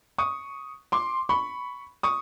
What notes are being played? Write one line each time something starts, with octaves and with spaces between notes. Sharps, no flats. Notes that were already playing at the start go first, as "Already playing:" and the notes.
C#6 D#6
C6 D6
B5 C#6
C#6 D#6